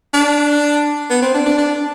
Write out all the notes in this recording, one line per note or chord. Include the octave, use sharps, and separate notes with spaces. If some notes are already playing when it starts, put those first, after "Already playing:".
D4
B3
C4
D4
D4
D4